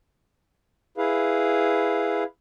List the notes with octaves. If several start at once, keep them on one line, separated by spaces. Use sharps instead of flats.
E4 G#4 B4 F5